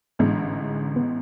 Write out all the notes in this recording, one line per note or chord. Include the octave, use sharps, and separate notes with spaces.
A1 G#2 D3 E3 G#3
B3